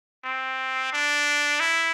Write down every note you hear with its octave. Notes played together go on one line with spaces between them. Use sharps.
C4
D4
E4